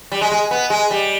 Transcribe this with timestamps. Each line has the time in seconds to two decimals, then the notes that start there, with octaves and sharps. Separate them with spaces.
0.12 G3
0.21 G#3
0.32 G#3
0.51 B3
0.70 G#3
0.91 G3